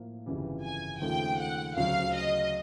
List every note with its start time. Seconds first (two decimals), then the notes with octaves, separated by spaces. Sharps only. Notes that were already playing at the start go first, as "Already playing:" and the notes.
Already playing: A2 F3 A#3
0.26 G1 F2 C#3 E3 G3
0.64 G#5
1.01 D#2 C#3 F3 A3 C4 G5
1.39 F#5
1.76 D2 C#3 F#3 F5
2.15 D#5